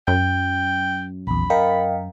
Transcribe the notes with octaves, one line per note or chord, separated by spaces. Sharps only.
F#2 G5
A#1 E2 B5
A#4 D#5 F5 G5